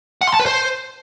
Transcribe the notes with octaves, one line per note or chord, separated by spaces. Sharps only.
F#5
C6
A5
B4
C5